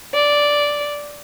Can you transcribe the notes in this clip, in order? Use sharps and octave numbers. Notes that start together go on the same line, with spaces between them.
D5